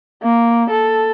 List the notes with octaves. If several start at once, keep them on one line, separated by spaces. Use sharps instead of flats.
A#3
A4